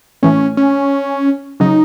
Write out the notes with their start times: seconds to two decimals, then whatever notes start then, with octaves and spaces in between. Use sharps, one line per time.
0.23 A2 E3 A3 C#4
0.57 C#4
1.60 C#3 F#3 C#4 D#4